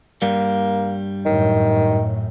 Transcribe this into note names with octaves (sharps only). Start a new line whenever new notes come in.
G2 G3 A#3
F#2 A2 D#3